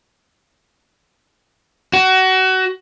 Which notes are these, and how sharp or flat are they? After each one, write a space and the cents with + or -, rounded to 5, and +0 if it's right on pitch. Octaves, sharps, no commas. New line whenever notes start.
F#4 +25